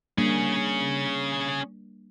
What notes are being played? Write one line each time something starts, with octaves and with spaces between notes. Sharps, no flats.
G3 A#3 C#4 D4 G#4